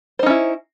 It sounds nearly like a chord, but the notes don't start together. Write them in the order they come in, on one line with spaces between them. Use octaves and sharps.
C5 D#4 C#4 E4